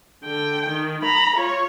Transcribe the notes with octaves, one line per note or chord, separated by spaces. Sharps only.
D3 G5
D#3
A#5 B5
F4 C#5